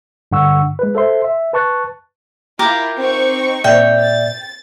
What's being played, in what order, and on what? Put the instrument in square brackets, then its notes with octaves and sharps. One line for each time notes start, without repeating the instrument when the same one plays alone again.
[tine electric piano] G2 D3 F#5 C#6 E6
G#3 B4
A4 C5 E5 C6
E5
B4 A5 C#6 F#6 A6
[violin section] E4 F4 [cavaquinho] G4 A#4 D6
[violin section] C4 D#4 C#6
[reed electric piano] A#2 D5 E5 [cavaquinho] G5
[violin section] A6